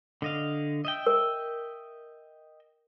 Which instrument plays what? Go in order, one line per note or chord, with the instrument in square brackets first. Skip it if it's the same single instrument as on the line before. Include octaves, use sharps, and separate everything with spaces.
[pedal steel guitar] D3 D#5 F5
D#5 E5 G5
[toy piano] A#4